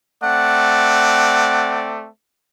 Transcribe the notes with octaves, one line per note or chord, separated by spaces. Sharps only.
A3 C4 D5 F#5